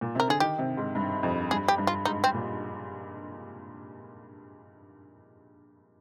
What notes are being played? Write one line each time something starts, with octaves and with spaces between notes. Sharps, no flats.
A#2
C3 A#4
D3 G#4
D#3 G4
C3
G#2
G2
F2
G2 G#4
G4
G2
F4
G#2 D#4
C4
A#2